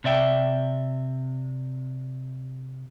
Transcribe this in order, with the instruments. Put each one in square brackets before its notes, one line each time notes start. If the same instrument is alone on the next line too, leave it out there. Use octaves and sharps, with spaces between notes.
[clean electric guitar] C3 D5 E5 G5